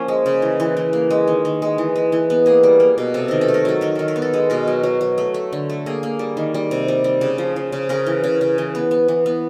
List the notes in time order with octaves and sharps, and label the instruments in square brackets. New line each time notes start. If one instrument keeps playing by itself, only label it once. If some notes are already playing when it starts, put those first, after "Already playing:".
Already playing: [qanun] F3 A#3 C#4
G#3
C#3
E3
E3
E3
A#3
G#3
D#3
D#3
G#3
E3
G#3
E3
B3
A#3 G#4
G3
A#3
B2
C3 A4
D#3 A#4
A4
A3
A#4
F#3 A4
D#3 A#4
D#3 A4
A#4
B3
A4
G#3
B2 A#4
F#3
F#3
F#3
A3
A3
D3
A3
A#3 G#4
A#3
G3
D#3
G3
C3
G3
G3
C#3
F3
F3
C#3
C#3 A#4
E3
C#3
C#3
E3
B3
B3
E3
B3